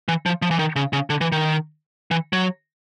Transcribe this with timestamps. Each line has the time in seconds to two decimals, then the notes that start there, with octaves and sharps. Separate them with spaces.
0.08 E3
0.26 F3
0.42 F3
0.51 E3
0.59 D#3
0.76 C#3
0.93 C#3
1.10 D3
1.21 E3
1.32 D#3
2.11 E3
2.33 F#3